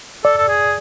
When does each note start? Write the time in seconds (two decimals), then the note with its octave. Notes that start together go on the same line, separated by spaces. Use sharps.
0.24 A4 D5
0.37 A4
0.49 G#4